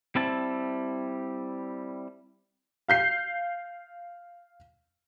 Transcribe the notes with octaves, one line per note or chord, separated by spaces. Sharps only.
G3 C4 E4 A5
F5 G6 C7